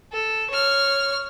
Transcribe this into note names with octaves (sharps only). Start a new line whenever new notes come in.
A4
C#5 F6